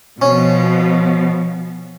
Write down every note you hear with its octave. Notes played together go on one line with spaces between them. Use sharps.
B2 F3 C#4